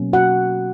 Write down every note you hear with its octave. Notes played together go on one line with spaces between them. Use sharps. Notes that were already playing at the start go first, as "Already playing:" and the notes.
Already playing: B2 F#3 A#3 C#4
F#4 F#5